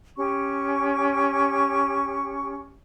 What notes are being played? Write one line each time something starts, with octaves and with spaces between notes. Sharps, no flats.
C#4 G4 C#6